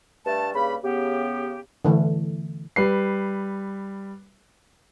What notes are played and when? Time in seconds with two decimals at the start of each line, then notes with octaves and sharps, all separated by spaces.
0.25 G2 A3 A5
0.54 G2 C#3 A#3 B5
0.83 C#3 B3 G4
1.85 D3 E3 A3
2.76 G3 B4 C7